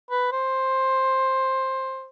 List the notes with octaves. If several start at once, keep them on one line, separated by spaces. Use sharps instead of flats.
B4
C5